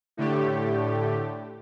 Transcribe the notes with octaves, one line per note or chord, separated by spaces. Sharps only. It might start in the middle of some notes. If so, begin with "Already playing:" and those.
A2 D3 A3 G4